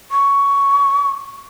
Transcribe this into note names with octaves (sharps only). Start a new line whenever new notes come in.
C#6